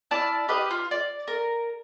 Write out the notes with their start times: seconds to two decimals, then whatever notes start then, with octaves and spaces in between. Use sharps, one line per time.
0.11 E4 D5 A5 F6
0.48 G4 B4 D#5 F5
0.71 F4
0.91 D5
1.28 A#4